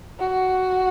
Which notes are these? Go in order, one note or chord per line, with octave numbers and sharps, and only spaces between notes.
F#4